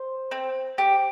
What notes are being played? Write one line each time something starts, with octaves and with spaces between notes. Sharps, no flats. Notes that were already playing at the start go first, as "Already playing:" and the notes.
Already playing: C5
C4
G4